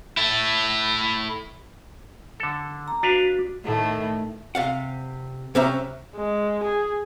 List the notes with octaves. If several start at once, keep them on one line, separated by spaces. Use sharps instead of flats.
E4 A4
D3 A4
A#5
D4 F#4 B4 F5
A2 D#3 A3
C3 F5 F#5
C3 F#3 C#4 C5 E5 A#5
G#3
G#4